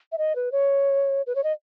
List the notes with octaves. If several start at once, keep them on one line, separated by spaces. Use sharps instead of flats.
E5
D#5
B4
C#5
B4
C#5
D#5